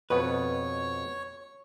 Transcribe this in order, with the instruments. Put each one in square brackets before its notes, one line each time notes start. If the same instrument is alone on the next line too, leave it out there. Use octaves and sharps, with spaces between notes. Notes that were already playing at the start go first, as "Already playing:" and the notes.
[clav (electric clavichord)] F2 B2 B3 [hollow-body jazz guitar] B4 [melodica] C#5